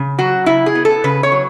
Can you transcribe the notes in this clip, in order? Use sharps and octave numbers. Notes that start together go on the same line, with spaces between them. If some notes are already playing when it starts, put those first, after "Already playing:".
Already playing: C#3
F#3 F#4
C#3 E4
G#4
B3
A4
C#3 B4
C#5
F#3